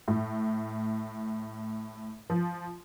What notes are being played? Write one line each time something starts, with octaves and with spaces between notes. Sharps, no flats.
A2
F3